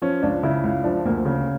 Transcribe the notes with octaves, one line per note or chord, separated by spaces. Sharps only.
F3 C#4
C#2 D4
C#3 E4
C#2
F3 D4
D2 A#3
C#3